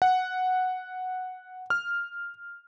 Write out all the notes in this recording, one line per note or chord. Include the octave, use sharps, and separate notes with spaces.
F#5
F6